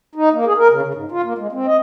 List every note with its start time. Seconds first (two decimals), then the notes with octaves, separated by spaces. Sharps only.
0.15 D#4
0.33 A#3
0.45 G#4
0.58 A#4
0.71 C#3
0.83 C#3
0.94 G#2
1.11 F4
1.24 A#3
1.38 G#3
1.52 C4
1.66 D#5